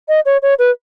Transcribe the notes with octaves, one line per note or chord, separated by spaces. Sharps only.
D#5
C#5
C#5
B4